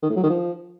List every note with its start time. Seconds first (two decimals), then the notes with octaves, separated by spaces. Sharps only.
0.03 D#3
0.10 A2
0.16 F#3
0.23 D#3
0.30 F3